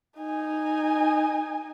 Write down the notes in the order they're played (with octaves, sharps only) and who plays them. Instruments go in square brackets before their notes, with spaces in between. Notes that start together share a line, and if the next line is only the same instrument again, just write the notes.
[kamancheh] D#4 G#5